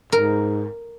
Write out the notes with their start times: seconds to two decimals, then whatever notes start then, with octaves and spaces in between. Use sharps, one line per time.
0.12 G#2 A#4